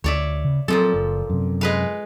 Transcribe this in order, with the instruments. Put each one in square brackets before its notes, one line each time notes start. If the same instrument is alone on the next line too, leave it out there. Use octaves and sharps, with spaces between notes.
[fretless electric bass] D2 [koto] C#5 D5 E5
[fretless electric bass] C#3
[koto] A#2 F3 A4 [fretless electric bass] F#3 C4
[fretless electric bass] F#1
F#2 C3
[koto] G#3 B4 F5